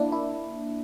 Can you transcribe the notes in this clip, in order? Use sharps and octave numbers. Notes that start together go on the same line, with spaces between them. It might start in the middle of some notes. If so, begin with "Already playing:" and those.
Already playing: A#3 D4 E4
E4